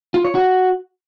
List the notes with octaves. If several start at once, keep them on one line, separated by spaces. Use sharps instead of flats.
F4
C#5
F#4